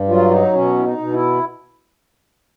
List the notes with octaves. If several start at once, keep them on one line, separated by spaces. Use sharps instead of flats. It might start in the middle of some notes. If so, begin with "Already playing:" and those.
Already playing: G2
F#3 F4
D#4
B2 C#4
E4
D#4
B2
E4